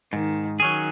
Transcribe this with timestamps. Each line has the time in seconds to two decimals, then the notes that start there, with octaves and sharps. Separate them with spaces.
0.13 G#2 D#3
0.60 D#3 F#3 C#4 G#4